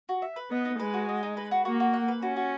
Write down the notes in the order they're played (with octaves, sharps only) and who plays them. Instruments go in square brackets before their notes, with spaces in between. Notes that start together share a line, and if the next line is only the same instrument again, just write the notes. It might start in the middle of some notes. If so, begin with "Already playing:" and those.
[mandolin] F#4
E5
B4
[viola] B3 [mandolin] D#5
[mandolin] D#4
[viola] G#3 [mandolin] B4
[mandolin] F#4
D#5
D#4
B4
F#4
[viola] A#3 [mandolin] F#4
[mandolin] F#4
F#5
B4
[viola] C#4 [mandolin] F#4
[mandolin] F#4